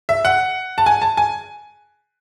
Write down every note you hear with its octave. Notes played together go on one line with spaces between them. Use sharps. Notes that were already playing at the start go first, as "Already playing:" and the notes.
E5
F#5
A5
G#5
A5
G#5